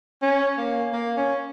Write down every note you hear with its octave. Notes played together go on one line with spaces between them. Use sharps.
C#4
A#3
A#3
C#4